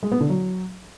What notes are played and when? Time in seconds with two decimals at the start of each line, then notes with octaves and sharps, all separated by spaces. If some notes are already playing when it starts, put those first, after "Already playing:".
0.03 G#3
0.12 B3
0.20 D3
0.29 F#3